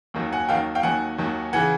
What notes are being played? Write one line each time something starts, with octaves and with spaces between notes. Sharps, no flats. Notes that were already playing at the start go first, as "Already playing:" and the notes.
D#2 D#3 F#3
F#5 G#5
D#2 D#3 F#3 F5 G5
F5 G5
D#2 D#3 F#3 F#5 G#5
D#2 D#3 F#3
C#3 E3 F#5 G#5